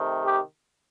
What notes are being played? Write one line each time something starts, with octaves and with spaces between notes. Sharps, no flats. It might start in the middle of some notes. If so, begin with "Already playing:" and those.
Already playing: C3 D#3 A3
G4